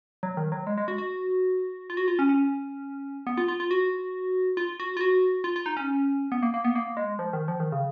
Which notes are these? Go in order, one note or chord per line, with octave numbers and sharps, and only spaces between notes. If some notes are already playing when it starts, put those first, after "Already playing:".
F#3
D#3
F#3
G#3
G#3
F#4
F#4
F4
F#4
F4
C#4
C#4
B3
F4
F4
F4
F#4
F4
F#4
F4
F#4
F4
F4
D#4
C#4
B3
A#3
A#3
B3
A#3
G#3
F3
D#3
F3
D#3
C#3